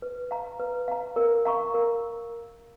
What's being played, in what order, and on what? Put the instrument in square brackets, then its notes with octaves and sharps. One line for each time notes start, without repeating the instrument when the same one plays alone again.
[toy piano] B4
F5 A#5
B4
F5 A#5
A#4
F5 A#5 C#6
A#4